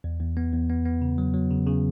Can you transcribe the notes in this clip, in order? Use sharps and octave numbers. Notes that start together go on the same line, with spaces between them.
E2
E2
B3
E2
B3
B3
C#3
F#3
F#3
C#3
C#3